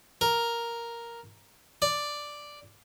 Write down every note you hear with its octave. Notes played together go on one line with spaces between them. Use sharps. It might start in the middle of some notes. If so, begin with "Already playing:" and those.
A#4
D5